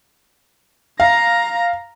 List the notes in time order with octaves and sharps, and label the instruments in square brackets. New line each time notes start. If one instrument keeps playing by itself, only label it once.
[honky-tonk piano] F5 [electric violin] A#5 A#6